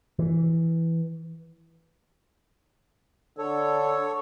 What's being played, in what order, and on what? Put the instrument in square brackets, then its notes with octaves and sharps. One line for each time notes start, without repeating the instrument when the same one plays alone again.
[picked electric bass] E3
[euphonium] D3 [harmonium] A4 C#5